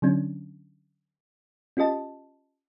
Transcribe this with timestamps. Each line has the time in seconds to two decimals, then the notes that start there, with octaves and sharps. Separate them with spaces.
0.02 D3 F#3 C#4 D4
1.77 C#4 F4 G4 D#5 A5